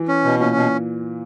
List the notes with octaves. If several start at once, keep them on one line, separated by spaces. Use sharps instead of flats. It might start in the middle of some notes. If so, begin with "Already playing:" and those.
Already playing: E3
C#4
B2
A#2 C#4
B2